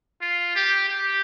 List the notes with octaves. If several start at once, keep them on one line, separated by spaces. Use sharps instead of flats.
F4
G4
G4